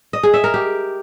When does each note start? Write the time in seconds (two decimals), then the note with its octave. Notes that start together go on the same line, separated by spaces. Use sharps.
0.13 D#5
0.23 G#4
0.34 E5
0.44 A#4
0.54 G4